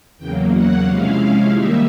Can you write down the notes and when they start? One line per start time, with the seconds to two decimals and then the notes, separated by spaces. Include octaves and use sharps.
0.17 E2 C#3 F#3 A#3 G5
0.51 F#5
0.84 C3 F3 G#3 C#4 E4 F5
1.52 D#3 G3 A#3 D#4 E5